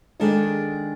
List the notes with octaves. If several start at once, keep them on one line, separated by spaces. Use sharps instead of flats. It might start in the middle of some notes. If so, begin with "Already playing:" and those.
D#3 G#3 D4 G#4 A4 D#5